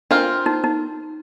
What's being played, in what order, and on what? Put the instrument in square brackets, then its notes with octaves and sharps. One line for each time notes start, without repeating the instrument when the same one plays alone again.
[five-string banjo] C4 F4 A#4 [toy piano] D4
[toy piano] D#4
D#4